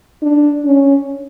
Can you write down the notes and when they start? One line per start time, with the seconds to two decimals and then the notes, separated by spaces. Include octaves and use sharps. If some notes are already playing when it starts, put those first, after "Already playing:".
0.23 D4
0.65 C#4